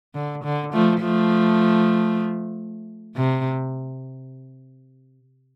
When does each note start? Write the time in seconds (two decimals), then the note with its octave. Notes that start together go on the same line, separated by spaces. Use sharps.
0.15 D3
0.44 D3
0.73 F3 A3
1.01 F3 A3
3.16 C3